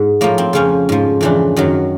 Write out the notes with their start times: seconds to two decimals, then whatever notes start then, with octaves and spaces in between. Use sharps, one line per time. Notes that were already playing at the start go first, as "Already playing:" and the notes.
Already playing: G#2
0.21 A2 F3 A#3
0.38 C4
0.53 F2 C#3 F3 C#4
0.89 G#2 F3
1.21 F2 C#3 E3 D4
1.57 F#2 D#3 F#3